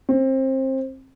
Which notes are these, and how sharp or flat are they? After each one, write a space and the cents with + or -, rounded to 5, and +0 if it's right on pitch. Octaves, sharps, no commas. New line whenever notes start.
C4 +25